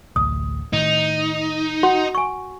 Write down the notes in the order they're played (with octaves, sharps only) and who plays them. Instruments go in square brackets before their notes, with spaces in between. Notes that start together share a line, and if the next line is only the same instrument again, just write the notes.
[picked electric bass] A1 D2 [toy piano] D#6
[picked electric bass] A2 D#3 [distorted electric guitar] D#4
[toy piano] F#4 F#5 C6
G#5 C#6